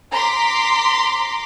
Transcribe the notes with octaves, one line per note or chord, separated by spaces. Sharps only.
A#5 C6 D6 B6